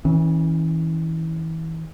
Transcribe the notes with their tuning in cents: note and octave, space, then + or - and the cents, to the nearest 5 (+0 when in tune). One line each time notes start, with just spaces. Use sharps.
E3 -35 C#4 -15